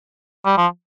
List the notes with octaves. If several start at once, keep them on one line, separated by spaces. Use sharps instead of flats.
G3
F3